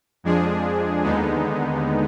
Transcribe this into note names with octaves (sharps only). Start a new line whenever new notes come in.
F2 F3 G#3 D4 G#4
D#2 D3 G#3 B3 D#4